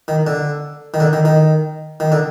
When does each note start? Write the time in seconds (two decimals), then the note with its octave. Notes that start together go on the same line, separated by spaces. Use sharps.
0.08 D#3
0.27 D3
0.94 D#3
1.00 D3
1.13 D#3
1.25 D#3
2.00 D#3
2.12 D3